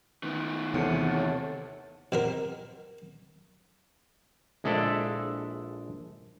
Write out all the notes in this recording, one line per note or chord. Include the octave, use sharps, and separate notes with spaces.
D#3 B3
E2 C3 A4 C#5 F#5
B2 C4 A#4
A#1 G#3 D4 E4 A4 D5